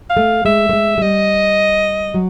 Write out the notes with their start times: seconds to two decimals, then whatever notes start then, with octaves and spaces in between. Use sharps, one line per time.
0.10 F5
0.17 A3
0.45 G#3 E5
0.69 A3
0.73 G#3
0.98 G#3
1.01 G3 D#5
2.14 F#3